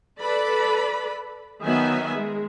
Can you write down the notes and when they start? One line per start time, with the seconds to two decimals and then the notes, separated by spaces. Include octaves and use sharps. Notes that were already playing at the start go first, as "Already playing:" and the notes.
0.20 A4 B4 D5 B5
1.63 D#3 F#3 B3 E5 G#5
2.14 G#3